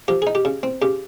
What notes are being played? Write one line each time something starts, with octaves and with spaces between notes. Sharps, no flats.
F3 G4
D#4 G#4
G4
C#3
C4
C#3 G4